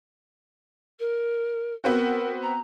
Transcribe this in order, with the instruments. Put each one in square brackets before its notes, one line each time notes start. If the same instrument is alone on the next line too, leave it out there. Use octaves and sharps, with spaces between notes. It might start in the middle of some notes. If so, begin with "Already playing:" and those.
[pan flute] A#4
[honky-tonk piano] B3 C4 F#4 [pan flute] A#4
[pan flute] A#5